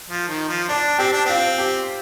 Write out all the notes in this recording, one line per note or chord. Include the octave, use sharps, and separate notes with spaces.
F3
D#3
F3
D4 D5
C4 G4
D4
C4 F4
G4